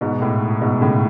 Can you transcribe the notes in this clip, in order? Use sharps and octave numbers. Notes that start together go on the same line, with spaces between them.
G#2 B2
A2
G#2 B2
A2 C#3